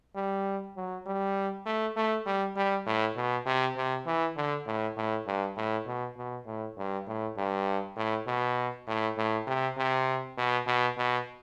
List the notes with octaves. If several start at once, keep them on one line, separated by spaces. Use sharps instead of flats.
G3
F#3
G3
A3
A3
G3
G3
A2
B2
C3
C3
E3
D3
A2
A2
G2
A2
B2
B2
A2
G2
A2
G2
A2
B2
A2
A2
C3
C3
B2
B2
B2